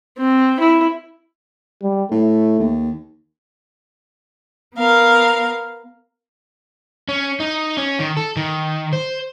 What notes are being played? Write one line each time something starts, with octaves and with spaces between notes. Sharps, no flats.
C4
E4
G3
A2 A3
D#2
B3 A#4 F5
C#4
D#4
C#4
D#3
A4
D#3
C5